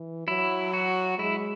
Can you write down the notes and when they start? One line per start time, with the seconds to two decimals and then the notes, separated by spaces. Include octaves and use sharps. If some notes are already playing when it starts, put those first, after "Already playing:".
Already playing: E3
0.27 F#3 E4
0.74 F#4
1.18 G#3 E4